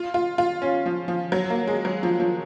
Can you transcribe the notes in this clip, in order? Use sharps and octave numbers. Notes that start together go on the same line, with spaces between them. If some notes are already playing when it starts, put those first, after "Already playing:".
Already playing: F4
F4
F4
C#4
F3
F3
F#3
A#3
G#3
F#3
F3
F3